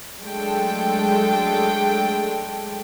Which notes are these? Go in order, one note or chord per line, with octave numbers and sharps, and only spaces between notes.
F#3 G#3 A3 D4 A4 G5